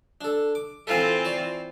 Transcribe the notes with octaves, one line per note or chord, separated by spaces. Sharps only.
D4 A4
D6
E3 C4 F4 A4 F5 G#5
C#5 D5